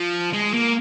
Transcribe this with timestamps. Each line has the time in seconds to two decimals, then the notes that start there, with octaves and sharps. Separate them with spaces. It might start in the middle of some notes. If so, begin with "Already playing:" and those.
Already playing: F3
0.33 G#3
0.54 A#3